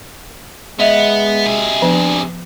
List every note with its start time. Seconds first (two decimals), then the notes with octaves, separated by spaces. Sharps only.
0.79 G#3 B3 D#5 E5 F7
1.46 C3 G#4
1.82 F3 B3 D4